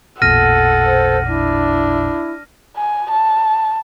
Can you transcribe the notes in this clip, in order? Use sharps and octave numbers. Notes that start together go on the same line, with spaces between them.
A1 E2 A#2 A4 F#5 F6 A#6 D#7
C5
D4 E4
G#5
A5